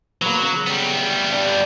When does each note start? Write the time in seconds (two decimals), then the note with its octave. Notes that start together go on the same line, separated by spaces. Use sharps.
0.22 F#3 A#3 B3
0.41 C#3
0.67 G3 B3
0.95 D2
1.29 G2 D4